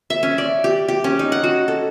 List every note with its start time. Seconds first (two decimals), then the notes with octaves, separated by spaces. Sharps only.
0.10 E5
0.23 C#4
0.38 D5
0.64 G4
0.88 G4
1.04 C#4
1.19 D#4
1.32 F#5
1.44 F#4
1.68 A4